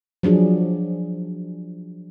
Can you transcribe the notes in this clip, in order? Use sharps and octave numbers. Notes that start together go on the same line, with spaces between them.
F3 F#3 D4 G#4